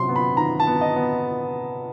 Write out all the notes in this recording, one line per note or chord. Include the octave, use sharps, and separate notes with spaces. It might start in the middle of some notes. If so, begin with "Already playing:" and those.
Already playing: C3 F#3 C6
B3
B5
D#3 A#5
A5
B3
D#5
B3